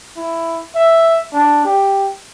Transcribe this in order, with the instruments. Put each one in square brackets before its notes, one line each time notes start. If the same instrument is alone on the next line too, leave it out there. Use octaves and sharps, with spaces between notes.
[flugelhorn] E4
E5
D4
G4